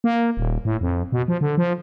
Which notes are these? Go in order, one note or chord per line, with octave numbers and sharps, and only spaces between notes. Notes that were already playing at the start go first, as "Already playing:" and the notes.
A#3
D#1
A2
F2
B2
F3
D3
F3